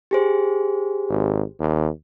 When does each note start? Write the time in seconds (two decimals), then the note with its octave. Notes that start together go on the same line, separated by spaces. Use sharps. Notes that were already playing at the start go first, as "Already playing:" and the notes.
0.11 G4 G#4 C5
1.09 G#1
1.60 D#2